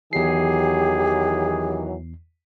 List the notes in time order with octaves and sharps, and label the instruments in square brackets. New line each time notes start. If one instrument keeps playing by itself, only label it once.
[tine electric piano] E2 C7 [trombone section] D#3 E3 F#3 [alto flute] G4 [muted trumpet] G#4